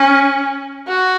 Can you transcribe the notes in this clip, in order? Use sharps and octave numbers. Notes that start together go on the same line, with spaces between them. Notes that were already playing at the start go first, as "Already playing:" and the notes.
Already playing: C#4
F#4